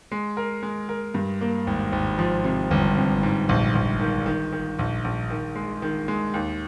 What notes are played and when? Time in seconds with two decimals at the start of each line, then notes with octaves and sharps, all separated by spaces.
0.12 G#3
0.37 A#4
0.63 G#3
0.89 A#4
1.14 G2
1.41 A#3
1.67 G#1
1.92 G#1
2.19 F3
2.44 C3
2.71 G1
2.97 C3
3.23 G#2
3.49 A#1
3.75 A#1
4.00 D#3
4.26 D#3
4.52 D#3
4.79 A#1
5.04 A#1
5.30 D#3
5.55 G#3
5.82 D#3
6.08 G#3
6.34 D#2